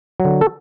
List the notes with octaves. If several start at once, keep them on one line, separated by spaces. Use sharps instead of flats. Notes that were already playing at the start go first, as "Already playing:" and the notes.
F#3
D3
A4